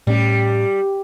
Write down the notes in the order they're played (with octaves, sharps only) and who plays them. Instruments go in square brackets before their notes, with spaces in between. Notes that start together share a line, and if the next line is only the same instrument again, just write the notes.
[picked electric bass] A2 C#4 [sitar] G3